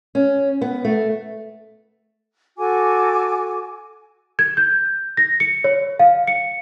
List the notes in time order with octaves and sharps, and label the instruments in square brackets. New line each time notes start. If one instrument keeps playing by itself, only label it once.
[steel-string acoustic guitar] C#4
B3
A3
[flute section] F#4 A4 G#5 D6
[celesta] G#6
G6
A#6
C#7
C#5
F5
C#7